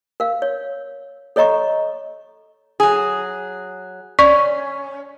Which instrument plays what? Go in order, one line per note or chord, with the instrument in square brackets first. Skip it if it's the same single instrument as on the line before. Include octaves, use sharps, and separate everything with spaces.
[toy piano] A#4 F5
C#5
A4 C#5 D#5 A#5 C#6
[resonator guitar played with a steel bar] F#3 G#4
[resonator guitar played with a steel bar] C#4 [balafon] D5 [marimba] C#6